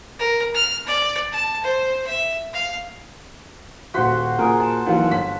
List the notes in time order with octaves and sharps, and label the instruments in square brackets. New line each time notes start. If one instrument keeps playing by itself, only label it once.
[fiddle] A#4
F6
D5
A5
C5
E5
F5
[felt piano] D#1 B6 [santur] F#4 C5
[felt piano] A#2 [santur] G#4 A#4
[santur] A5
[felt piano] D#2 E3 F#3
G1 B6